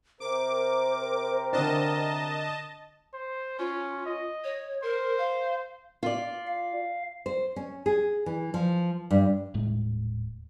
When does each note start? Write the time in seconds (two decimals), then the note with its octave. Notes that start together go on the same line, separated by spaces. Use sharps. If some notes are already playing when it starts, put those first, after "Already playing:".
0.20 C3 A#4 C5 D6
1.53 D3 D4 D#5 A5
3.14 C5
3.59 C#4 F4
4.06 D#5
4.44 C#5
4.83 A#4 C5
5.18 F5
6.03 F4 D5
6.47 F5
7.26 C5
7.56 C#4
7.86 G#4
8.26 E3
8.54 F3
9.11 G2
9.54 D#1 A2 G#3